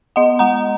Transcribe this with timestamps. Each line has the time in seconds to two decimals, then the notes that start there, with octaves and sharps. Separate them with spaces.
0.16 B3 D#5 F#5
0.39 G#3 F#5 A#5